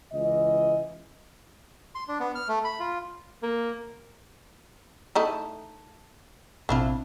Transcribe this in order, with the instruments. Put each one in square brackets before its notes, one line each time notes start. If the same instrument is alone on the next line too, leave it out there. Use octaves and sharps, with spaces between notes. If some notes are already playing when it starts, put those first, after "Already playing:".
[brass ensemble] C#2 C#3 E3 D#5
[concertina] C6
D4
B3
F6
A3
B5
F4
[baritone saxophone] A#3
[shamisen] A3 D#4 E4
[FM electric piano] A1 B2 C4 [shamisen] D4 E4 F4